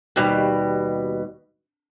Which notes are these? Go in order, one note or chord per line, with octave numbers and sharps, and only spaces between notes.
D#2 B2 G3